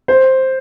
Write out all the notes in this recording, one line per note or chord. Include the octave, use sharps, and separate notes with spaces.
C5